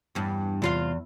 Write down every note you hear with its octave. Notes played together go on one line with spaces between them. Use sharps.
E2 G2
E2 C3 F4 F5